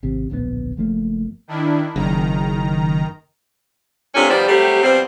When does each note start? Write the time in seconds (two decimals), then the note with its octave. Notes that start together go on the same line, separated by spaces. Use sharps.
0.03 G#1 C3
0.30 D1 A#1 C3 B3
0.77 F#1 F3 A3 A#3
1.48 D#3 D4 E4
1.96 F#1 D#3 A#5
4.15 C3 A3 A#3 C#4 D4 F4
4.29 D#3 F3 G3 B3 C5 D5
4.48 F#3 G3 A3 C4 G4
4.83 B2 F3 G3 C4